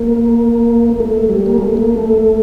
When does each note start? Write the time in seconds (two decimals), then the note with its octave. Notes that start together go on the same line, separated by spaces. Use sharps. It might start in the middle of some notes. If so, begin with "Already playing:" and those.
Already playing: A#3
1.00 A3
1.29 G3
1.46 A#3
1.58 A3
1.77 A#3
1.96 A3